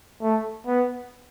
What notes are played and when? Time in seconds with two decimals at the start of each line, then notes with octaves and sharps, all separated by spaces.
0.22 A3
0.67 B3